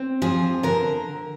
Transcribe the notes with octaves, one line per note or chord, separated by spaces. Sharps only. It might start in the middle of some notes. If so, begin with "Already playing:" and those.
Already playing: C4
F3 G#4
D3 A#4